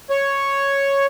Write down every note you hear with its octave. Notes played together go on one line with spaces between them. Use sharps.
C#5